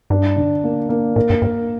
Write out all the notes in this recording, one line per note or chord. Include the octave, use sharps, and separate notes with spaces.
G2 D4
D3
A#3
A#3
A2 A#4
G2
G2 A#4